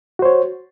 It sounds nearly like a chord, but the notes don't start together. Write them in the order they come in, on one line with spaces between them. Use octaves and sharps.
F#4 C5 C#5